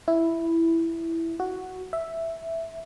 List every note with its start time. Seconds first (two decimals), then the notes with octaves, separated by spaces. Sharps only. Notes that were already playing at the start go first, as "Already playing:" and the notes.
0.08 E4
1.40 F#4
1.93 E5